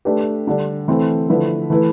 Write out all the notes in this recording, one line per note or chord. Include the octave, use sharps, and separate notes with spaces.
A3 D4 G4 B4
D3 G3 D4
E3 A3 C4
D3 F3 A3 E4 B4
E3 A3 E4 B4